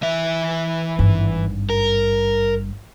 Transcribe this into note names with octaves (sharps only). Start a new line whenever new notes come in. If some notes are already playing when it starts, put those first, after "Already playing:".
E3 E5
G#1 G2
A#4